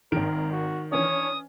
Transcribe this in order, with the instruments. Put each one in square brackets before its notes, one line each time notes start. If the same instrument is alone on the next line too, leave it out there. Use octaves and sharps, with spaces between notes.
[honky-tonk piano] G#1 D7 [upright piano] D#3 [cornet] A#4
[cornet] F#4
[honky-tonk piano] E3 C#4 D4 [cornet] C#5 [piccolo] D#6